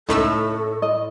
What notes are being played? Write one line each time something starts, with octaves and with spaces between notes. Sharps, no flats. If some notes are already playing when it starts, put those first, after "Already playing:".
C#2 A2 A3 D#4 A4 E6
D#5